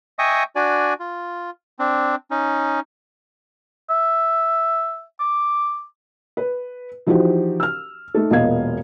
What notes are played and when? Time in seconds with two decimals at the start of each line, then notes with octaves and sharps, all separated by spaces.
0.19 D#5 E5 G5 G#5 C#6 D#6
0.56 D4 F#4 D5 G#5
1.00 F4
1.79 C4 D4
2.31 C#4 D#4
3.90 E5
5.19 D6
6.37 B4
7.07 E3 F3 D#4 F#4 G4 C5
7.60 E6 F6
8.15 A3 D#4 A4
8.31 E1 A#2 B3 D#5 F5 G#6